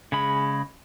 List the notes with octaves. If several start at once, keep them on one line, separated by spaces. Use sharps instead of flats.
C#3 G#3 B5